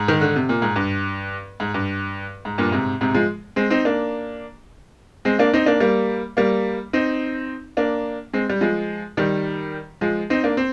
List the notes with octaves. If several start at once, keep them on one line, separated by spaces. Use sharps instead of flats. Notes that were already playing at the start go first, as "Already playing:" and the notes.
Already playing: G#2
D#3
D3
C3
A#2
G#2
G2
G#2
G2
G#2
G2 A#2
G#2 C3
G#2 C3
F3 G#3
G#3 C4
C4 D#4
A#3 D4
G#3 C4
A#3 D4
C4 D#4
A#3 D4
G3 A#3
G3 A#3
C4 D#4
A#3 D4
G#3 C4
G3
F3 G#3
D#3 G3
F3 G#3
C4 D#4
A#3 D4
C4